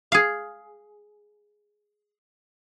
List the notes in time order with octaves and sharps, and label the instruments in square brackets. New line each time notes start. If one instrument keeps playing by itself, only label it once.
[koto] G#4 F5